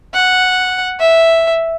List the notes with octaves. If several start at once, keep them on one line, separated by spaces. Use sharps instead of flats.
F#5
E5